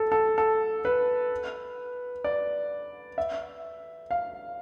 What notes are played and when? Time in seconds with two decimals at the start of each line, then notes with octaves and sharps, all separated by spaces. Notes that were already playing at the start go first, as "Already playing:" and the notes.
Already playing: A4
0.12 A4
0.38 A4
0.85 B4
2.24 D5
3.18 E5
4.11 F5